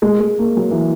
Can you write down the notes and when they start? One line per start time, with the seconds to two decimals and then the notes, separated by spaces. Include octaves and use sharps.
0.02 G#3
0.20 G#3
0.39 A#3
0.57 F#3
0.71 E3